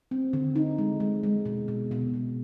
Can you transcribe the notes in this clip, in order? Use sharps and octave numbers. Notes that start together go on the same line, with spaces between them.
C4
D3
D#4
G#3
G#3
G#3
B2
B2
B2
B2